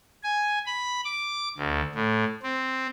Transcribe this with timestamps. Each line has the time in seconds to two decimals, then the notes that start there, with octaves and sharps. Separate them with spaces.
0.24 G#5
0.66 B5
1.05 D6
1.58 D2
1.95 A2
2.43 C4